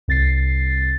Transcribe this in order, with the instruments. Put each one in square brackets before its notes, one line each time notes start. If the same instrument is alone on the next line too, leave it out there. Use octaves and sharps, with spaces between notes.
[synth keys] C2 A6 C7